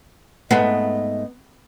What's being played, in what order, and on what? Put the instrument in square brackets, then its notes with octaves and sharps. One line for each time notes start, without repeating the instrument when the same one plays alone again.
[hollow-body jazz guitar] G#2 A3 [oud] B3 [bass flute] D#5